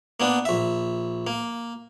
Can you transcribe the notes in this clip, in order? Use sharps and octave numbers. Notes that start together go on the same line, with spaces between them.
A#3 B3 D4
A#1 E5
A#3